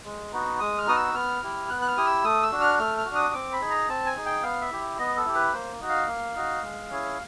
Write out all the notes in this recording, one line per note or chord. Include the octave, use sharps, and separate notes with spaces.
G#3
B3 D#4 F#4
G#3 D#6
F6
B3 D#4 F#4 D#6
E6
B3 F6
E4 G4
B3 F#6
F#6
F6
E4 G4 D#6
E6
A3 D#6
E6
D4 F#4
F6
A3 F6
F6
D4 F#4
D#6
C4 D6
B5
D#4 G#4
A#5
C4 A5
G#5
D#4 G#4
G5
B3 F5
E5
E4 G4
B3 D#5
A4
E4 G4
B4
A#3 C5
D#4 F#4
F5
A#3
D#4 F#4
G#3
C#4 E4 G#4